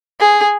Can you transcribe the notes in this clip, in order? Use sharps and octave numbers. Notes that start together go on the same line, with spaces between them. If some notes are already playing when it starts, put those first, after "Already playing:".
G#4